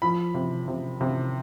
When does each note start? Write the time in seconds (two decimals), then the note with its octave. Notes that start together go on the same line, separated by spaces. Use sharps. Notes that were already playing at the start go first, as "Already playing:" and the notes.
0.02 F3 B5
0.34 C3
0.68 C3
1.01 C3